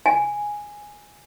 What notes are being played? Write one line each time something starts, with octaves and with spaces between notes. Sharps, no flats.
G#5